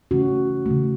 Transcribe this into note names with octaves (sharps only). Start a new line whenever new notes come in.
C#3 E3 A3 C#4 F#4
C#3 E3 A3